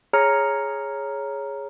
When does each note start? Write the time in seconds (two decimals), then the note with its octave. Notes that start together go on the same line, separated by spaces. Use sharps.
0.13 G#4 C#5 A#5 F6 C#7